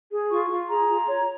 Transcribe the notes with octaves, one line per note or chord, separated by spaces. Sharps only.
G#4
F4 C#6
F4
G#4 A#5
F4
C#5